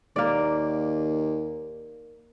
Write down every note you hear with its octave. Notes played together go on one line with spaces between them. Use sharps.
D#2 A#3 D5